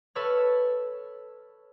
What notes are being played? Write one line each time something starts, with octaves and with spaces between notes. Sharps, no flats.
A4 B4 C#5 E6 F6